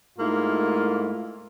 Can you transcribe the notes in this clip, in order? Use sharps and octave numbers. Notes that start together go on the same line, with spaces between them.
G#2 A3 A#3 E4 F4